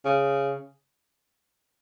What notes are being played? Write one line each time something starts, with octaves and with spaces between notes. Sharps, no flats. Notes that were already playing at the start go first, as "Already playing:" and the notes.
C#3